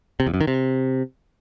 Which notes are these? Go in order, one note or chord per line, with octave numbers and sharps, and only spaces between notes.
C3
E2
F#2
D#3
C3